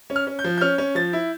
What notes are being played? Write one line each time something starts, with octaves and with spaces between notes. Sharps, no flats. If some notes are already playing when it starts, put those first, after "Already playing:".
C#4
F6
C#4
G6
F3
G6
C#4 F6
C#4
F3 A6
E4